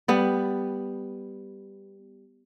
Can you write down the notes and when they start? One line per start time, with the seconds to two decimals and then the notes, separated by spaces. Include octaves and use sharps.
0.08 G3 B3